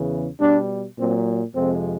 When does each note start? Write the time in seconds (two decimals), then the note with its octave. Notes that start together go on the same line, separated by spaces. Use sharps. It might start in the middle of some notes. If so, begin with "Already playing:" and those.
Already playing: E2 C#3 E3
0.40 B2 G3 D4
0.97 A#2 F#3 C4
1.53 F2 C3 F3 G#3 C4